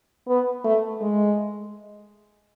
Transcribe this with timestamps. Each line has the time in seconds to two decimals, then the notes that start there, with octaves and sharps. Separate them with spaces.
0.28 B3
0.65 A3
1.01 G#3